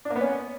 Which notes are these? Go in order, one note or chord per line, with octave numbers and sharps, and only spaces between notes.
D4
A#3
B3
C#4